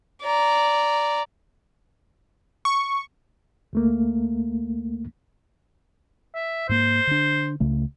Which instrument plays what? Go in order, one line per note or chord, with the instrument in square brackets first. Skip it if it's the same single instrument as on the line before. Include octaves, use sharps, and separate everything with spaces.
[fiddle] D5 A#5
[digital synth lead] C#6
[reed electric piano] D2 A3 A#3
[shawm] E5
[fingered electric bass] G#2 A#3 [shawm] C5
[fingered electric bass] D3 D4
C#2 C#3 A3